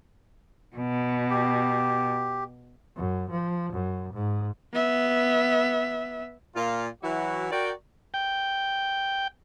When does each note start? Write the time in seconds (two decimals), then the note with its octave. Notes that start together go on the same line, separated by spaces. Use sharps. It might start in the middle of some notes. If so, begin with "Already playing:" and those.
0.76 B2
1.30 G4
2.96 F#2
3.31 F3
3.73 F#2
4.14 G#2
4.73 B3 E5
6.56 A#2 F4
7.03 E3 F#3 E4 F#4
7.52 F#4 A#4 D5 G5
8.14 G5